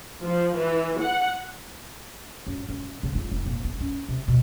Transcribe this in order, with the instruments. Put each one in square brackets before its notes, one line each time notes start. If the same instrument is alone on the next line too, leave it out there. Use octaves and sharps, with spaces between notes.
[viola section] F3
E3
F#5
[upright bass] F#2
F#2
C#3
F4
F1
A#2
B3
C#4
C3
B2